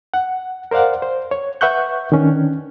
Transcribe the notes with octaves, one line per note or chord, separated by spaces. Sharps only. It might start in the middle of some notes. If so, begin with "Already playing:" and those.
F#5
A#4 C5 D5 F5 F#5
C5
C#5
B4 E5 F#5 C#6 F#6 G6
D#3 C#4 D4